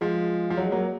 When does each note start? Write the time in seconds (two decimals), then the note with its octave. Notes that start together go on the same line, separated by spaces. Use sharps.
0.01 F3 G#3
0.50 F3
0.57 F#3
0.64 G#3
0.71 F#3 A#3